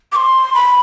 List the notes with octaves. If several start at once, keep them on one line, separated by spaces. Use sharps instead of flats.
D6
C6
B5